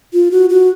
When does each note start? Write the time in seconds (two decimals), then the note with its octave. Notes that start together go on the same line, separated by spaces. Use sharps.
0.13 F4
0.31 F#4
0.50 F#4